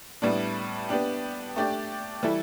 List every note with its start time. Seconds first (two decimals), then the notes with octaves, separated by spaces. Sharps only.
0.22 A2 G3 B3 D4
0.89 B3 D4 G4
1.56 A3 D4 G4 D5
2.23 E3 G3 E4 A4